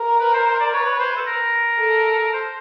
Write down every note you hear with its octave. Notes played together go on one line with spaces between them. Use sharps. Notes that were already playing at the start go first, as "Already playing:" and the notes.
Already playing: A#4
B4
C5
C5
D5
B4 C#5
C5
A4
A#4
A4
C5